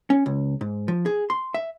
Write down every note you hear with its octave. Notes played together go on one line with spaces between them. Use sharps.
C#4
C#2
G#2
F3
G#4
C6
E5